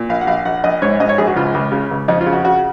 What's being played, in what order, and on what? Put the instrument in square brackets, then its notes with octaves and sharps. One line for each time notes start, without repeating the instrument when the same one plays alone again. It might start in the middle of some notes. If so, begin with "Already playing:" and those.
Already playing: [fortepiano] A#2
A#1 F5
F#5
A#1 F5
A#1 F#5
A#1 D#5
G#2 C#5
G#2 D#5
C#5
A#1 G#4
F#4
C#2 F4
C#2
C#3
C#2
F2 D#4
F4
C#3
F#4
C#3 F#4